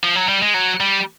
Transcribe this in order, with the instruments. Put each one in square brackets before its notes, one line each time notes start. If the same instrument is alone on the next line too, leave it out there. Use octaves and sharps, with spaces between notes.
[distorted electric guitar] F3
F#3
G3
G#3
F#3
G3